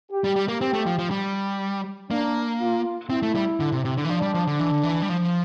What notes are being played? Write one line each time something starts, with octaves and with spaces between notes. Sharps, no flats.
G4
G3
G3
A#3
C4 G4
A3
F3
F3
G3
A#3 D4
F4
C4 E4
A3
G3
D3
C3
C3
D3
E3
F3 D4
G3
F3
D3
E3
D3
E3
G3
F3